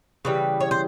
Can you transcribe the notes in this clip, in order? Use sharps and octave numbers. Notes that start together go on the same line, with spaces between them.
C#3 E3 G3 B4
C#5
C5